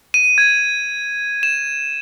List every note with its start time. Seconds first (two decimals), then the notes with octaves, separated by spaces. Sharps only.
0.14 D#7
0.38 G#6
1.43 E7